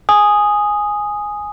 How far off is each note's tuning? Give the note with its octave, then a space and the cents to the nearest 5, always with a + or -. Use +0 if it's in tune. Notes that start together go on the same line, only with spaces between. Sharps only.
G#5 +0 D#6 +0